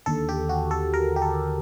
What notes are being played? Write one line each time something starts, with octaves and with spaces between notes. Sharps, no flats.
D#2 D3 A4
G4
F#4
A4
A#4
G4
A4